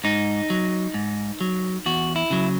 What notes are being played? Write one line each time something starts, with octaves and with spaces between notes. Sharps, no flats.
G#2 D#4
F#3
G#2
F#3
E2 F#4
E4
C#3 F#3